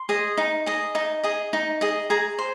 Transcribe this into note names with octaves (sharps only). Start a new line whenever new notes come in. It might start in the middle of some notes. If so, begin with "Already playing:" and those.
Already playing: C6
G#4 D#5
D#4
G#4 D#5
D#4
G#4 D#5
D#4
G#4 D#5
G#4 A#5
C5